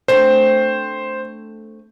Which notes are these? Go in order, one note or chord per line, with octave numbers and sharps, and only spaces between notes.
A3 C4 D4 C5